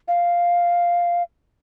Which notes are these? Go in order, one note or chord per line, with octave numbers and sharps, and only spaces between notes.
F5